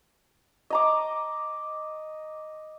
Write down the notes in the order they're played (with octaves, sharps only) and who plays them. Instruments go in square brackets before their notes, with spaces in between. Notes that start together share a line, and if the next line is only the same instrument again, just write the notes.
[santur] D#5 A#5 D6